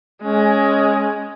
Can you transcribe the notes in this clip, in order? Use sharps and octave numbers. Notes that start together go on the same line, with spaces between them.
G#3 C#4